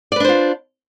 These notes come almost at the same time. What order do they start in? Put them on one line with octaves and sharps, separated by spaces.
D5 B4 D4 C5 F4